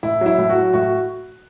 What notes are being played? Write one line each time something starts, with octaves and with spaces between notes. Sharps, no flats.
A2 E4
F#3 E4
A2
F#4
F#3
A2 F#4